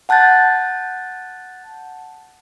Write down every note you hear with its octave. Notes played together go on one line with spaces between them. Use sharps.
F#5 A5 F#6 G6 A6